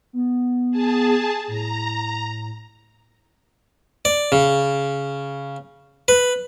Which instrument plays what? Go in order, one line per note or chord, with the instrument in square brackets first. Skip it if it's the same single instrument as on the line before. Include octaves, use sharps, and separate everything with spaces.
[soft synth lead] B3
[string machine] G#4 A5
[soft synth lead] A2 [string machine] A#5
[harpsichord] D5
C#3
B4